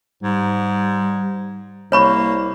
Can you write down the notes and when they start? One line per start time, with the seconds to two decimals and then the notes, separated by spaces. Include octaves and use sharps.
0.23 G#2 G3
1.92 C2 A#3 C#5 B5 C#6